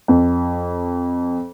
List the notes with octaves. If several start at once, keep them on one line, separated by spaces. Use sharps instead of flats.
F2